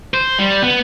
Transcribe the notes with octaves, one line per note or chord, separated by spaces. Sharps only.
C5
G3
B3